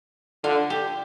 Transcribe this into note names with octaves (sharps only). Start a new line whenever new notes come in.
D3 F4
G4